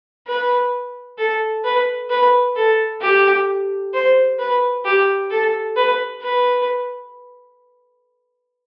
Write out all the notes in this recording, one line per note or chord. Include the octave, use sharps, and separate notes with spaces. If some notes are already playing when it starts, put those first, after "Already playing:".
B4
A4
B4
B4
A4
G4
C5
B4
G4
A4
B4
B4